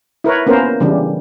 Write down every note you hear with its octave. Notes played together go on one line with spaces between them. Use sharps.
E4 A#4 B4 C#5
A#3 B3 C#4 A#4 C5
C#3 E3 G3 D4